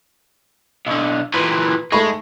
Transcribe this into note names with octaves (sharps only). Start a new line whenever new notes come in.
B1 D3
A#2 E3 B4
G#3 A3 B5 C#6